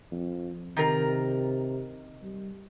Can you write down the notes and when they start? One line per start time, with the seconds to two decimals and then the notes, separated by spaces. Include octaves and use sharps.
0.11 F2
0.77 C3 D#3 A#4
2.23 G3